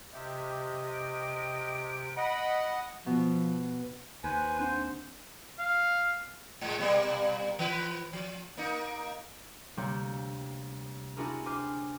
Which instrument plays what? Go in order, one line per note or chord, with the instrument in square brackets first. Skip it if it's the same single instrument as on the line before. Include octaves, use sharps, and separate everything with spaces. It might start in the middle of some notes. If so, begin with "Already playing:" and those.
[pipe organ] C3 G4 [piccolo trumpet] D#5 [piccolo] E5
[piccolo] D7
[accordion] D#5 F#5 [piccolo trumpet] B5
[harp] B2 [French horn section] F3
[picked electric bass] D#2 [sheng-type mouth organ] B4 C5 [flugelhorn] G#5 [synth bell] B5
[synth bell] C4 D4 F#5 [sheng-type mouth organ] C5
[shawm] F5
[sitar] A2 G#3
B2 G3 A#3
E3 B4
F3
A#3 D#4
[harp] D2 C3 G3 A#3 C#5 G6
C4 D4 E4 F#4 G#4 A#4
C5 G#5 D6 F6 C7